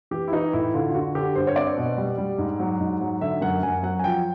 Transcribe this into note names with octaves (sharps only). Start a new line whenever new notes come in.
E3 G4
E4
E3 D#4
A2 E4
D3 F4
F4
D3 F#4
D3 G4
G2 C5
C#5
C4 D5
B2
G3
G3
G#2
F#3
G#2
F#3
D3 E5
F#2 F#5
F#2 G#5
F#3 F#5
G#5
F3 G5